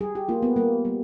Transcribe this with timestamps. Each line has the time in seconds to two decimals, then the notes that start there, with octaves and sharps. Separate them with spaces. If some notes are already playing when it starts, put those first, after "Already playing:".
0.01 G3 G#4
0.15 G4
0.29 A#3 F4
0.42 B3
0.56 G3 A#3
0.85 G3